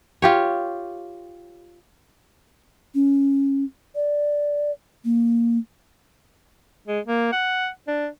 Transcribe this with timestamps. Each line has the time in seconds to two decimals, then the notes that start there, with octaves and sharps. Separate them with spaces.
0.22 F4 G4 C#5
2.95 C#4
3.95 D5
5.05 A#3
6.87 G#3
7.07 A#3
7.32 F#5
7.88 D4